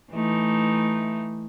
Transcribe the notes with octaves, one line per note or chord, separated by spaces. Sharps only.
E3 A3 D#4